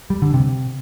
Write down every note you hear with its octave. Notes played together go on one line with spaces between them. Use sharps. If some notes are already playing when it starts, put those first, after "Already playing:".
G3
D3
C3